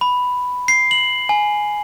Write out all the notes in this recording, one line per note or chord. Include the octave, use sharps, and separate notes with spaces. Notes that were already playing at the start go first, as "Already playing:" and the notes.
B5
C7
F#7
G#5